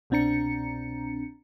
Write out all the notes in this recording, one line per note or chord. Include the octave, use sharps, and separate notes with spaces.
C2 B2 C4 D4 A#5 C#7